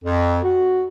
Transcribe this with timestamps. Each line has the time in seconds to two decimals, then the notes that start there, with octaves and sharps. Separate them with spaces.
0.04 F2
0.44 F#4